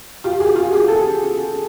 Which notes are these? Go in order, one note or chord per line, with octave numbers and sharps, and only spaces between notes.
F4 G4
F#4 G#4
F4 G4
F#4 G#4
G4 A4